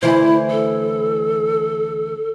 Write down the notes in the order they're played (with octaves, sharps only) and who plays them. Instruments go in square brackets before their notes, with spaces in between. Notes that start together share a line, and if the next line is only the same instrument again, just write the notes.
[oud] D2 E3 C5 [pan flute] E4
[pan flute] A4